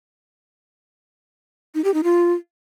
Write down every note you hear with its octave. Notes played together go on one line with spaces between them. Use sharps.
D#4
G4
D#4
F4